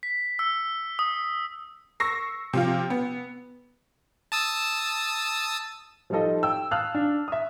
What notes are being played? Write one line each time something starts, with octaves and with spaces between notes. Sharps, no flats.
B6
E6
D#6
C#6 E6 A#6 C7
C3 F3 F4
B3
A5 D#6 E6
F3 G3 D#4 F4 A4 D#5
G5 E6
F5 A5 D#6 F6 F#6
D4
E5 D#6